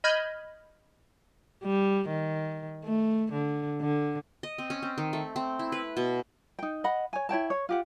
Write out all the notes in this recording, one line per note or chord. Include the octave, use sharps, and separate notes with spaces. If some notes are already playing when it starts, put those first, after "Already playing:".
D#5 B5 F6 G6 G#6
G3
D#3
A3
D3
D3
D#5
C4
C#4
C4
D#3
A3
C4
E4
B4
B2
D#4 G5
D#5 F#5 B5
C#5 G#5
E4 C#5 G5 A5
C#5
F4 G4 F#5